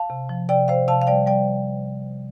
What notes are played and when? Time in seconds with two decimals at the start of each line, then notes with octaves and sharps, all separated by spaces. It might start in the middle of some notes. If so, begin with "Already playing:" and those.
Already playing: F5 A5
0.10 C3
0.29 F3
0.49 C3 D5 G5
0.68 C3 C5 F5
0.88 C3 F5 A5
1.02 F5
1.07 G3 D5 G5
1.26 G3 D5 G5